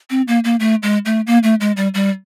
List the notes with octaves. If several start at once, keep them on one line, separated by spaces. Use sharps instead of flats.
C4
A#3
A#3
A3
G#3
A3
A#3
A3
G#3
G3
G3